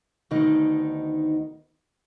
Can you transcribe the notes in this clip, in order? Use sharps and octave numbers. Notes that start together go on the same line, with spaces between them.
D2 B2 D#3 D#4